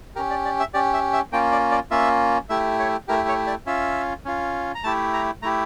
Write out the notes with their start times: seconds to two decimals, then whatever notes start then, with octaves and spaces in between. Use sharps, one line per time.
0.16 G4 A#4
0.18 C#4
0.30 D5
0.45 D5
0.60 E5
0.74 C#4 G4 D5
0.94 E5
1.13 E5
1.33 A#3 C#4 F4 G5
1.52 D5
1.71 D5
1.91 A#3 C#4 F4 E5
2.50 A3 E4 G4 E5
2.79 C#5
3.08 A3 E4 G4 A#4
3.28 C#5
3.47 D5
3.66 C#4 F4 E5
4.25 C#4 F4
4.75 A#5
4.84 A3 E4 G4 A5
5.13 A#5
5.42 A3 E4 G4 A#5